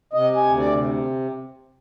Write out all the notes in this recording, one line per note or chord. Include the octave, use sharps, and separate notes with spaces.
C3 D#5
G#5
D2
D5
C3